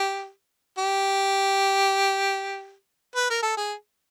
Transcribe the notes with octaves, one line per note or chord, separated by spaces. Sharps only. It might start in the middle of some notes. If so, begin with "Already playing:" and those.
Already playing: G4
G4
B4
A#4
A4
G#4